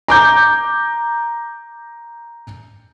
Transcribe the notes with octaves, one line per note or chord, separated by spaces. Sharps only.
A#5 D6 G6